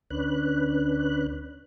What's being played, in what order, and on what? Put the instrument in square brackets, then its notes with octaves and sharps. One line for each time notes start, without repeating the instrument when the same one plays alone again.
[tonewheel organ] D2 C#4 D4 B4 F#6